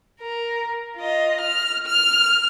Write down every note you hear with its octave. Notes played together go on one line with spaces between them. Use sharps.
A#4
F4 D#5
F6
F6